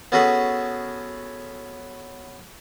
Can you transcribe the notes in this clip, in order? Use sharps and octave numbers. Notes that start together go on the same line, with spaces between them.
B3 C#4 F#4 G#4 A4 B4